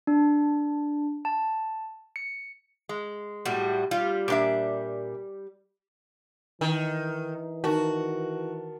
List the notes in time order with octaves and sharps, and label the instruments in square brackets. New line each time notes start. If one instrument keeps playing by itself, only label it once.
[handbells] D4
A5
C#7
[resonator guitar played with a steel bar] G#3
[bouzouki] A2 G3 F#4
[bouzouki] G3 [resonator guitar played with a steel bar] F4
[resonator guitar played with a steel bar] A#2 D4 E5
[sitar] D#3 [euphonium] E3
[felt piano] D#3 A#4 A5 [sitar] F#4